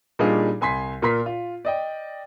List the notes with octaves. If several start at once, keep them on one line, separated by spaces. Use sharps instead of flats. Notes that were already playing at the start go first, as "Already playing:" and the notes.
A#2 G3 D4 D#4 F4 G#4
C2 G#5 C6 B6
A#2 A#4 C6 B6
F4
D5 D#5 G5